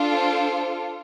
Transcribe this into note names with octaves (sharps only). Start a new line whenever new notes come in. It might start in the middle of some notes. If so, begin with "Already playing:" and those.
Already playing: D4 F4 A4
C5